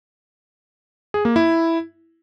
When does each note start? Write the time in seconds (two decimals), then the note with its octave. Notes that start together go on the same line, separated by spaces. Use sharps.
1.14 G#4
1.25 A#3
1.36 E4